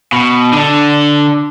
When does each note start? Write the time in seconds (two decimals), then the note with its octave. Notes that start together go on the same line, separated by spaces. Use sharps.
0.12 B2
0.53 D3 D4